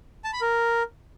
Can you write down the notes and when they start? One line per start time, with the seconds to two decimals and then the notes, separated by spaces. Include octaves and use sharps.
0.24 A5
0.33 B5
0.42 A#4